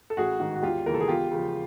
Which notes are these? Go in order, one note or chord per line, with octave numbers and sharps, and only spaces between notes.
A4
A1 F#4 G#4
G#2 D#3
F#4
E1 F4 G4
D#2 C#3 E3 A#4
A4
G#4
E2 F4 G4
C#3 F3